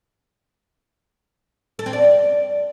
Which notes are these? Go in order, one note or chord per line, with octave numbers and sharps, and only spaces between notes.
A4
C4
D5